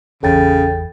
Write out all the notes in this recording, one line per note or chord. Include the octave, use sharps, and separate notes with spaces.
G#1 E2 C#3 A4 G5 A6